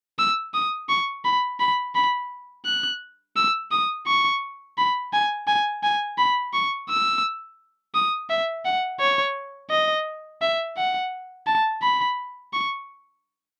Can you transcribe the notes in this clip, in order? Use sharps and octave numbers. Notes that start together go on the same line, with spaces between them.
E6
D#6
C#6
B5
B5
B5
F#6
E6
D#6
C#6
B5
G#5
G#5
G#5
B5
C#6
E6
D#6
E5
F#5
C#5
D#5
E5
F#5
A5
B5
C#6